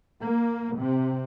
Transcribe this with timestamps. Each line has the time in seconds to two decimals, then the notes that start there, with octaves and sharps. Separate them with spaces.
0.21 A#3
0.77 C3